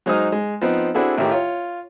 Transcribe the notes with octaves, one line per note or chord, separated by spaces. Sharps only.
F#3 G#3 D#4 C5 D#6 F6
G#3
F3 B3 C4 D#4
C4 D4 E4 F#4 G#4 A4
A1 A2 D#3 G4
F4 C#5